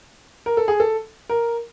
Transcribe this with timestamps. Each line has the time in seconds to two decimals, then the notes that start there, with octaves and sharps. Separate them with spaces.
0.46 A#4
0.57 A4
0.68 G#4
0.80 A4
1.29 A#4